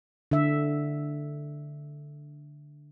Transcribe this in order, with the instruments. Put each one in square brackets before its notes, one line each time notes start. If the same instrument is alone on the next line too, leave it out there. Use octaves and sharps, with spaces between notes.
[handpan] D3 E5